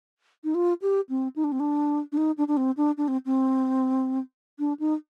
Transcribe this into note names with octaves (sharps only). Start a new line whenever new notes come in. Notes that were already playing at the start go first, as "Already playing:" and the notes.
D#4
F4
G4
C4
D#4
D4
C4
D4
D4
D#4
D4
D4
C4
D4
D4
C4
C4
D4
D#4